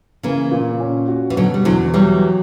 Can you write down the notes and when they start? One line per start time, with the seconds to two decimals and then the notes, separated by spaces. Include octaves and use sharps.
0.23 C#3 E3 A#3
0.51 A#2
0.80 C#4
1.08 F#4
1.30 E3
1.37 B2 D3 F#3
1.54 G3
1.65 E2 D3 F#3
1.94 E3 F#3 G3